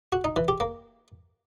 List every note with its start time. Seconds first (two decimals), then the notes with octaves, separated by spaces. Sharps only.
0.12 F#4
0.24 D#4
0.36 E3
0.48 G4
0.60 A#3